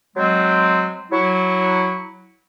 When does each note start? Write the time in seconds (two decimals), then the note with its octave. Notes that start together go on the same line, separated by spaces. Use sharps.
0.17 F#3 G#3 C4
1.12 F#3 E4 C#6